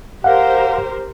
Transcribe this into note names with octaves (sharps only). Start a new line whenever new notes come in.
G4 A#4 C5 F5 F#5